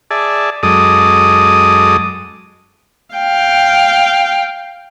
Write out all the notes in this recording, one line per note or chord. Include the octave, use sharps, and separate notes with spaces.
G#4 D5 E5 A5
F#2 G#3 A4 D#5 D6 D#6
F5 G5